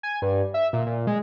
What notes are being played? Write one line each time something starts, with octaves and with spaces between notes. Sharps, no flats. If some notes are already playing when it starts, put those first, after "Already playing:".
G#5
G2
E5
A#2
A#2
G#3